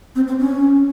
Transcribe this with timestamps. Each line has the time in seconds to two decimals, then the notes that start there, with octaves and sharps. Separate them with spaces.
0.16 C4
0.27 C4
0.39 C#4